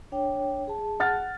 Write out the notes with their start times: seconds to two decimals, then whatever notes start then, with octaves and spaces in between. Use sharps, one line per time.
0.12 D4 C#5 G5
0.68 G#4 A5
1.00 F#5 F6 A6